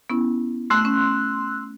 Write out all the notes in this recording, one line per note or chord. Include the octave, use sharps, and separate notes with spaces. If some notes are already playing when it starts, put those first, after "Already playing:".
B3 C#4 E4
A3 C6 E6 F#6
C#4